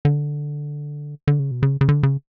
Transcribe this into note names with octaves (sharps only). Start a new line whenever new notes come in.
D3
D3
C#3
B2
C#3
C#3
D3
C#3